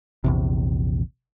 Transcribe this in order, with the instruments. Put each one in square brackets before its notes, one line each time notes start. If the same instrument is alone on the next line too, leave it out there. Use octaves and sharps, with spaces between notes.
[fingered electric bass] A#1 E2 C3